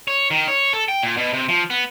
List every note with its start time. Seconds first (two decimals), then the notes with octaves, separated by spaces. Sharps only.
0.08 C#5
0.31 D#3
0.48 C#5
0.73 A4
0.88 G5
1.03 A#2
1.17 B2
1.33 C3
1.49 F3
1.70 B3